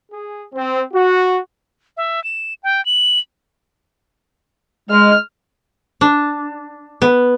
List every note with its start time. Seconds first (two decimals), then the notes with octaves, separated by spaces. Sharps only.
0.11 G#4
0.53 C4
0.92 F#4
1.97 E5
2.24 E7
2.63 G5
2.86 F#7
4.90 G#3 F6
6.01 D4
7.02 B3